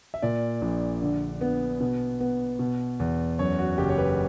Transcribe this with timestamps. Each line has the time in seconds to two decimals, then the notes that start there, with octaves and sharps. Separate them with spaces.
0.14 E5
0.22 A#2 D5
0.62 A#1
1.02 D3
1.41 B3
1.80 B2
2.20 B3
2.59 B2
3.00 E2
3.39 F#2 C#5
3.59 F#4
3.78 F#1 G4
3.89 C#5
3.98 B4